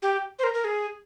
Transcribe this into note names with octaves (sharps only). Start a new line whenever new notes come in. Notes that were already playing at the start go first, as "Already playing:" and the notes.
G4
C5
A#4
A#4
G#4